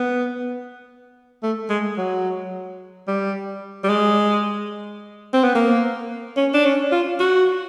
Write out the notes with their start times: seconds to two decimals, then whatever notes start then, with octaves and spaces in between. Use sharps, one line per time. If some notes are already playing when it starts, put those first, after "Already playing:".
Already playing: B3
1.43 A3
1.70 G#3
1.97 F#3
3.07 G3
3.84 G3
3.89 G#3
5.33 C4
5.44 B3
5.55 A#3
6.37 C#4
6.54 D4
6.65 C#4
6.92 F4
7.19 F#4